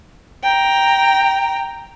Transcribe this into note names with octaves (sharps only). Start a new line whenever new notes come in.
G5 A#5